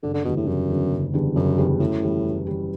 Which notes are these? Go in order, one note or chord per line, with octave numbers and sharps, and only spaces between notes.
F#1 D3
D3
E2 B2 D3 G3
A2
F#1 F#2
E2 D3 G3
F#1
E2 D3 G3
F#1 F#2
E2 D3 G3
F#2 A2
E3 G3
F#2
E3 G3